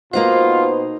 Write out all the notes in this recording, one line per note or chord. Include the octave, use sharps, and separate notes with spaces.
B2 A#3 D#4 F4 C5 F#5